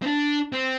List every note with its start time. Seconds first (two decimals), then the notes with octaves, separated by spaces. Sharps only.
0.02 C4
0.07 D4
0.52 C4